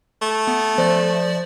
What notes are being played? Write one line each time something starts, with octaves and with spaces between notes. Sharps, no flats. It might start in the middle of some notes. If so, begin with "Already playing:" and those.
A3
B3
F3 C5 D5